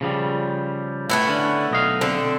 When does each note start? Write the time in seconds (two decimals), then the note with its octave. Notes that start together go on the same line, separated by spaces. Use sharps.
0.01 C#3 F3 G3
1.10 A2 A3 B3 E4
1.27 D3 C#4
1.71 B1 D#5 F5
2.01 D3 C4